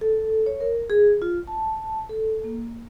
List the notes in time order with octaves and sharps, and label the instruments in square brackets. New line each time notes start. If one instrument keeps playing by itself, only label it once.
[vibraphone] A4
C#5
A#4
G#4
F4
A5
A4
A#3